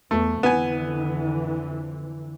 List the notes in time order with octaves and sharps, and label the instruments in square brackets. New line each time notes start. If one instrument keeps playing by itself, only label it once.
[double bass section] E2 B3 [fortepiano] A3
[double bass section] F2 D3 E3 [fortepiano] B3 G#5